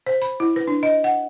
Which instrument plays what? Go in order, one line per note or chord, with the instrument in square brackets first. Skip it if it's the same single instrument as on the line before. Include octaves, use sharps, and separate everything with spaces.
[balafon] C5
B5
E4
B4
D4
D#5
F#5